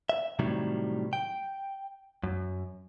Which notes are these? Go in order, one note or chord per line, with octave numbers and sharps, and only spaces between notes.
E5
A2 C3 D#3 F#3 G3
G5
F#2